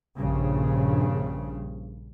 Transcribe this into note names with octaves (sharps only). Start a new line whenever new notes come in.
A#1 G2 C#3